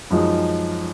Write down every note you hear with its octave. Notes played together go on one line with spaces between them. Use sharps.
F#2 F3 G#3 D#4